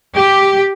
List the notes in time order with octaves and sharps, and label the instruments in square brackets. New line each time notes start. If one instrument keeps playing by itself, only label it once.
[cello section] G4